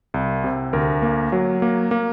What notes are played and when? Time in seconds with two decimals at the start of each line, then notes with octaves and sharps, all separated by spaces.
0.14 C2
0.44 C3
0.73 D2 A#4
1.02 A#3
1.32 F#3
1.62 A#3
1.91 A#3